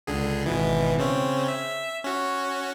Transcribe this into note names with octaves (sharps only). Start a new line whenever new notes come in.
C#2 D3 G#4
G#1 B2 E3
C#3 C4 C#4
E5
C#4 F#4